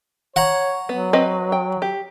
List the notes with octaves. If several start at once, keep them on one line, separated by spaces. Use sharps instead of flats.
C#5 F#5 A#5
F#3 B3
C4 B4 D#5
G5
G4